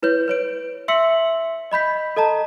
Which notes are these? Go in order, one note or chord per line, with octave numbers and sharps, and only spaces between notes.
E4 B4 C#5 G6
B4 C#5 D7
E5 C6 E6 B6 C#7 F#7
D#5 B5 G6 B6
A4 D#5 A5 A#5